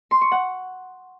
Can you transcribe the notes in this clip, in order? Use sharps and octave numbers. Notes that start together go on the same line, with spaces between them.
C6
C#6
F#5